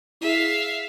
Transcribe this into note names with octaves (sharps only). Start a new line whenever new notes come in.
E4 G#4 E5 F5